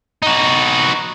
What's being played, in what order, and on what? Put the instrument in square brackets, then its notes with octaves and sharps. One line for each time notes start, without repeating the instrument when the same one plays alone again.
[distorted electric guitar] D#4 F#4